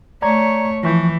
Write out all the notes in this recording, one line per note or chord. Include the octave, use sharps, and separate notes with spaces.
A3 C#5 D5 A#5 G#6
E3 F3 C#6 G6